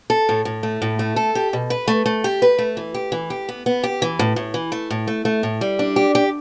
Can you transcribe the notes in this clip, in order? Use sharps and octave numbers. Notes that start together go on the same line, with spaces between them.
A4
A2
A2
A3
A2
A3
A4
G4
B2
B4
A3
A3
G4
B4
A3
E3
G4
E3
G4
B3
B3
G4
E3
A2
A2
E3
A3
A2
A3
A3
A2
G3
D4
G4
G4